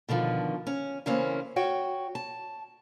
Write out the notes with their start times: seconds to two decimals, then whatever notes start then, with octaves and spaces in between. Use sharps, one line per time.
0.09 B2 D3 D#3 F3
0.67 C#4
1.06 C#3 E3 A3 A#3 C4 C#4
1.56 F#4 C#5 G5
2.15 A5